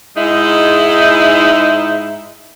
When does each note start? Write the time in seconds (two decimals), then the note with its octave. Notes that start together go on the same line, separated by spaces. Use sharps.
0.17 G#2 G#3 D#4 E4